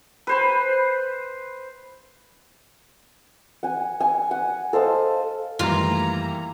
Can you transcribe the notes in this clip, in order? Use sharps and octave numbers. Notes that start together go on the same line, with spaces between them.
B4 C5 B5
F#5 G#5
G#5
F#5
A4 C5 D#5 F5
F#2 D#3 E3 G3 A3 A#3 F4 A#5